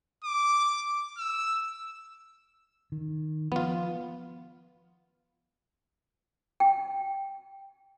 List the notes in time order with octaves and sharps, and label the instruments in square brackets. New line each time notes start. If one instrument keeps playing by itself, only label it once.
[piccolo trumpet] D6
E6
[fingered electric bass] D#3
[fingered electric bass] F3 [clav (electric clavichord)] B3 F4
[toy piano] G5